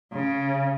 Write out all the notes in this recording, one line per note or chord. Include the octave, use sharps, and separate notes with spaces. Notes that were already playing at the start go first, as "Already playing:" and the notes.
C#3